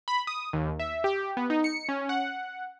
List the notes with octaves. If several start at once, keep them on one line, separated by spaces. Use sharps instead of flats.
B5
D#6
D#2
E5
G4
B3
D#4
C#7
C#4
F#5